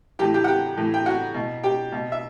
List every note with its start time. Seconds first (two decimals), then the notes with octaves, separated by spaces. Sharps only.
0.19 A2 E3 G4 G5
0.34 G4 G5
0.44 F#5
0.48 G4 G5
0.77 A2 E3
0.94 G5
1.06 F#4 F#5
1.34 B2
1.64 G4 G5
1.92 B2
2.12 E5